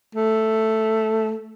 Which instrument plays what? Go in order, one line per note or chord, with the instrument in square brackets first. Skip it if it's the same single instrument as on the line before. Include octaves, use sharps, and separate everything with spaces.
[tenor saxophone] A3